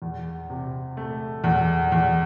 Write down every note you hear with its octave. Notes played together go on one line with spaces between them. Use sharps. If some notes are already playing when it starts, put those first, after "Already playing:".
E2
C3
A3
E2
E2